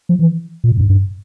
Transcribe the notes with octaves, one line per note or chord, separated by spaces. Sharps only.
F3
E3
A#2
A2
G2
G#2
G2